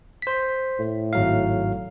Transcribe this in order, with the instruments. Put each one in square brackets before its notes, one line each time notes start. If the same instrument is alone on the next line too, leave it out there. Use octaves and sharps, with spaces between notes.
[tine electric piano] C5 B6
[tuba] A2
[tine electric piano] G#1 F#3 F5